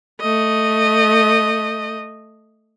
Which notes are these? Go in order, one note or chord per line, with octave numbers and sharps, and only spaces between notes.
A3 D#5